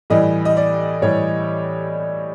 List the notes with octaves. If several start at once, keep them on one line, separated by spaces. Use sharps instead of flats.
A2 E3 G3 D#5
D#5
D5
A2 E3 G3 C#5